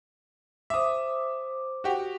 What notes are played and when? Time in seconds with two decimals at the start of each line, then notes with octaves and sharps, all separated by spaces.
0.70 C5 E5 D6 D#6
1.84 F#4 G4